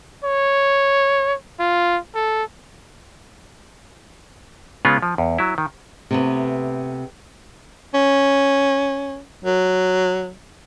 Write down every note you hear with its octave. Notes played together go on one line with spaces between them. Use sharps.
C#5
F4
A4
C#3 G#3 B3 C#4 F4
F3
E2
F#3 E4
D#3
C3 A3 B3
C#4
F#3